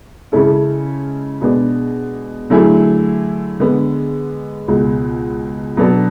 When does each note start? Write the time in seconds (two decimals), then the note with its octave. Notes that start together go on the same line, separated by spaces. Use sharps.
0.32 C#3 G#3 C#4 E4 A4
1.41 B2 G#3 B3 D4
2.50 D3 F#3 A3 E4 G#4
3.60 D3 G#3 B3
4.68 C#2 B2 G#3
5.77 B2 F#3 B3 D4 A4